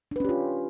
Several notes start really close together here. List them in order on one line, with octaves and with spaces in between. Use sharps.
D4 B4 C#4 G4 F4